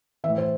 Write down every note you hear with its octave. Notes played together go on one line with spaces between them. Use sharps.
A2 E3 E5
C5